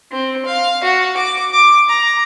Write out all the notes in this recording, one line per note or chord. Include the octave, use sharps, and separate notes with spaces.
C4
F5
F#4
D6
D6
A#5